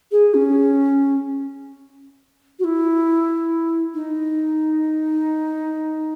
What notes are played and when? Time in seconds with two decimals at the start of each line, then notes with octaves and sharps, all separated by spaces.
0.11 G#4
0.34 C#4
2.59 F#4
2.64 E4
3.94 D#4